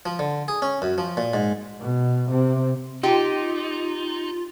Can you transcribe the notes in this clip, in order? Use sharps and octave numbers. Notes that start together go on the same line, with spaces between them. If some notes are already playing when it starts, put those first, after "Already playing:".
F3
D3
G#4
C#4
F#2
F3
A#2
G#2
B2
C3
D#4 F4 G4